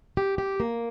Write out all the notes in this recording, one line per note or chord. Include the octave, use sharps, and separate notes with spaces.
G4
G4
A#3